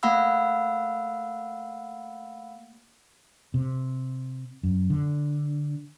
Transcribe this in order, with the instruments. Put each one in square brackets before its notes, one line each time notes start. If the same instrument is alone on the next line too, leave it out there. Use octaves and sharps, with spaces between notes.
[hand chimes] A3 A#3 F5 F#5 B5 E6
[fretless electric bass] C3
F#2
D3